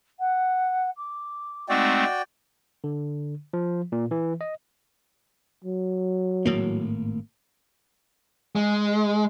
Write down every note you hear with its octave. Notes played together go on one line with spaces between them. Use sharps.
F#5
D6
G#3 A3 C4 D#4 F#4 D5 G5
D3
F3
A#2
E3
D#5
F#3
G#1 A2 A#3
G#3